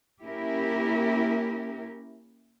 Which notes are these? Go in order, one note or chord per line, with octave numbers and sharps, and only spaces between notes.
A#3 C#4 E4 G4 A#4